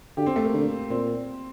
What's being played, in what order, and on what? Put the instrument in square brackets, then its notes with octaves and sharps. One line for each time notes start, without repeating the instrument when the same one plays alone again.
[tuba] D3 [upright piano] G4
[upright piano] C4
A3
A#3
[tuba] D3
[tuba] A#2 [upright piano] C4